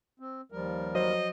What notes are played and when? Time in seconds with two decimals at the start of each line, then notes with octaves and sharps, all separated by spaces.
0.19 C4
0.52 D#2 F3 G3 A#4
0.95 F#3 C5 D#5